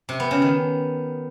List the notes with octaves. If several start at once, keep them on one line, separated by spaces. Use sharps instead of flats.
C3
B3
C#3
D#3